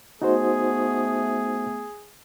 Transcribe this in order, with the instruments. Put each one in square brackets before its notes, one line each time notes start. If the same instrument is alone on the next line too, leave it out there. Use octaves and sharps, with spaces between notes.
[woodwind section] A3 B3 [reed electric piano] D#4 F#4 C5 [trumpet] G#4